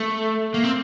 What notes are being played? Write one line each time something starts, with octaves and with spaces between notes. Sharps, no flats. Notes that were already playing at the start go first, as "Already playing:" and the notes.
Already playing: A3
A#3
C4